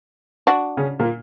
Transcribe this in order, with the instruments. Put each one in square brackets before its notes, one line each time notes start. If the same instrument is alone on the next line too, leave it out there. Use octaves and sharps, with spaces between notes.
[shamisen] D4 F#4
[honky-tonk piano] C#3 C#4
A#2 A#3